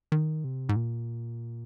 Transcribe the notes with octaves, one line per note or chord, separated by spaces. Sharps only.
D#3
C3
G#2
A#2